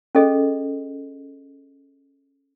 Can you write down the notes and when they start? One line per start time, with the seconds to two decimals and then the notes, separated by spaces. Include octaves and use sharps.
0.15 C#4 G#4 A4 D#5